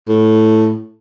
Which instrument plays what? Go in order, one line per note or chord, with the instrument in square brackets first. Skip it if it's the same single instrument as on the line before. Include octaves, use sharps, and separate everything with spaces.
[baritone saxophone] A2